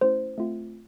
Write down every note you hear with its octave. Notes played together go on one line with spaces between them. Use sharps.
A3 C#4 E4 C5
A3 C4 F4